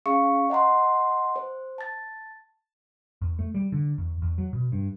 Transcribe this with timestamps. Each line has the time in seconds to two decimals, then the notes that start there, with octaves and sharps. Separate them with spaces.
0.06 C#4 G#4 F5 C#6 C#7
0.50 D#5 F#5 A#5 C6
1.36 C5
1.78 A5 A6
3.22 E2
3.39 A3
3.54 G3
3.72 D3
3.98 E2
4.22 E2
4.38 F#3
4.53 B2
4.72 G2